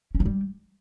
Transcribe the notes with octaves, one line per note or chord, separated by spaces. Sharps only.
C#4
F3
G3